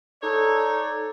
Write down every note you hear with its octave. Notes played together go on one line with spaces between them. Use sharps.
D#4 A4 C#5 D5